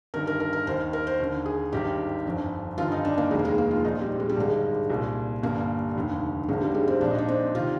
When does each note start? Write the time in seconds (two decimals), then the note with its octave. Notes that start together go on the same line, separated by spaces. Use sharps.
0.14 G1 G2 D#3 A#4
0.27 A#4
0.40 A#4
0.53 A#4
0.67 D#2 D#3 C5
0.93 A#4
1.07 C5
1.20 D#2 D3
1.46 G#4
1.72 G#1 G2 D#3 G4
2.26 G1 F2 D3
2.78 G1 G2 D#3 F4
2.92 D#4
3.05 D4
3.18 A#3
3.31 F1 D#2 D#3 G#3
3.39 A#3
3.45 G#3
3.58 A#3
3.71 F4
3.85 A#1 A#2 D#4
4.01 G3
4.20 G#3
4.29 G3
4.37 G#1 G2 D3 G#3
4.90 C2 A#2
5.43 G1 G2 D3 A#3
5.95 F1 D#2 D3
6.49 G#1 G2 D3 G#3
6.61 G3
6.74 G#3
6.88 C4
7.01 A#1 A#2 D4
7.11 D#4
7.18 D4
7.28 C4
7.55 C3 D#3 F4